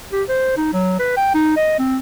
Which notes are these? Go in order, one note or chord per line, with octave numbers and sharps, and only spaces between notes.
G4
C5
D#4
F#3
B4
G5
D#4
D#5
C4